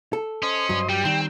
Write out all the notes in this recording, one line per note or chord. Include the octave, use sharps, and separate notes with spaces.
A4
C#4 C5 D#5
G2 F#3
G3 G4
D#3 G3 C4